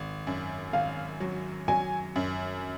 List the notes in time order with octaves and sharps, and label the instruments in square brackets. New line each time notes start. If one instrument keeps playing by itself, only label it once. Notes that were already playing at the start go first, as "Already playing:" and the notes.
Already playing: [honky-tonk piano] G#1
F#2
[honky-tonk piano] G#1 [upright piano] F5
[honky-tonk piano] F#3
[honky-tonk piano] F#3 [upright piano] G#5
[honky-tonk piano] F#2